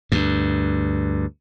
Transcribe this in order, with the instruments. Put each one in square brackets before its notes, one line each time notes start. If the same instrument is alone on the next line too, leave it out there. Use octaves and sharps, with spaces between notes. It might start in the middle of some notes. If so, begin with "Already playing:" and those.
[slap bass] D2 G2